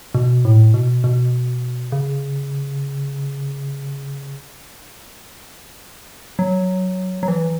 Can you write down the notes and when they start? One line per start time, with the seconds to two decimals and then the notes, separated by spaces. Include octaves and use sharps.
0.15 B2
0.45 A2
0.74 B2
1.04 B2
1.92 C#3
6.39 F#3
7.23 F#3
7.28 E3